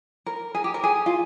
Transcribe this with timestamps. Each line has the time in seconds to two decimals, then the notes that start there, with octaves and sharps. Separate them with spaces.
0.26 A#4
0.55 G#4
0.64 G4
0.74 A#4
0.84 G#4
1.06 F4